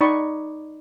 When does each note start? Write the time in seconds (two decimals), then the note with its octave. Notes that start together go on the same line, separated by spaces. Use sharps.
0.01 D#4 D5 B5 C#6